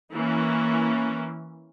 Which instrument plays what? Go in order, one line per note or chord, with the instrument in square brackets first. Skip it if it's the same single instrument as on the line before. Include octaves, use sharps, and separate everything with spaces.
[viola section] E3 A#3 C#4